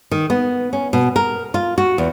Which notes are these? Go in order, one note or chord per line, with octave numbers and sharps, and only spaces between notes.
D#3
B3
C#4
B2
A#4
F4
F#4
E2